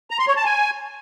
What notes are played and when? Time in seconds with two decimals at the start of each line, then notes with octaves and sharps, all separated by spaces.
0.11 A#5
0.19 C6
0.28 C#5
0.37 A5
0.45 G#5